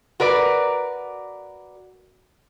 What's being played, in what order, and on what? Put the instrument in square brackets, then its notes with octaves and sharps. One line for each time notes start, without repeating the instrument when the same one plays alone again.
[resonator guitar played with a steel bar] F#4 A#4 B4 D5